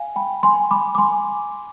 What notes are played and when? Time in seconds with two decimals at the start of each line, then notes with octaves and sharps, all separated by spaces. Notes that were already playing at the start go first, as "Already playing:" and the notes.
Already playing: F5 G#5
0.16 G5 B5
0.43 G#5 C6
0.71 B5 D6
0.95 D6
0.98 G#5 C6